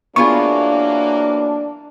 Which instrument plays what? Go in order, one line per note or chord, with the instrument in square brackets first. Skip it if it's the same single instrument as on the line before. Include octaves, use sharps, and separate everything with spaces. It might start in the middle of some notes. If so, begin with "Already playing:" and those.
[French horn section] E3 F#3 A#3 [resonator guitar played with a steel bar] B3 F4 G#4 [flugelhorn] D4 [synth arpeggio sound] C#6